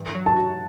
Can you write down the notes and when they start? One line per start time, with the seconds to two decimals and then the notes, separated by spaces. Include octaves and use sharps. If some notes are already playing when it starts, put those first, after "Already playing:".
Already playing: G2 E3
0.15 F#3
0.26 A5
0.36 F#4